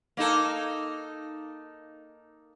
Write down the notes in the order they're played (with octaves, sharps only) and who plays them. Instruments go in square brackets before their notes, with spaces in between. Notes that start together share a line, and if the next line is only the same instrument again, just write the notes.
[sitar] A#3 D#4 A4